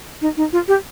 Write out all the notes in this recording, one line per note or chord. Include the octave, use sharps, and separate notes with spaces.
D#4
D#4
F4
G4